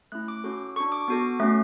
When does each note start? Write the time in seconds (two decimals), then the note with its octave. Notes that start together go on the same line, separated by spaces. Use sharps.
0.12 A3 C#4 E4 F#6
0.28 D6
0.44 C#4 F#4 A4
0.76 D4 F#4 A4 C#6
0.92 D6
1.08 B3 F#4 A4
1.40 A3 C#4 F#4